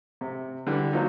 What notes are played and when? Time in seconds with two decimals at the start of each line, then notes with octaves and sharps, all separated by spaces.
0.21 C3
0.67 D3 E3 G3
0.93 F3 F#3 A#3 D4 D#4 F4